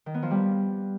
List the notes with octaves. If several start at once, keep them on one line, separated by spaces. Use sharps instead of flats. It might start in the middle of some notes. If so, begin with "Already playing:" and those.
D#3
B3
F3
G3